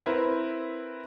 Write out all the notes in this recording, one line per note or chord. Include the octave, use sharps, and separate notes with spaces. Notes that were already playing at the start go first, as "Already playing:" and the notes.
C4 E4 A#4 B4